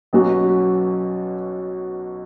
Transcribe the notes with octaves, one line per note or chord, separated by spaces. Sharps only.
B1 B2 F#3 C#4 F#4